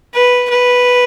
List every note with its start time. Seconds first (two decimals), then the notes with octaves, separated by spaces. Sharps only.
0.14 B4
0.50 B4